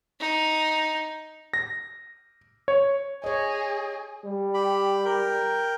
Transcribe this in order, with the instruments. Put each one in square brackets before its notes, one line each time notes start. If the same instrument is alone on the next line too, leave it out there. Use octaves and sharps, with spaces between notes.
[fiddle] D#4
[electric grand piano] A#6
C#5
[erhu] G#4 [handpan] C#5 D#5
[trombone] G3
[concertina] G4 B5
A#4 G5